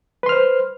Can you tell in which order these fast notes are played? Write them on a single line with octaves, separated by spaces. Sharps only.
B4 C6 F6 C5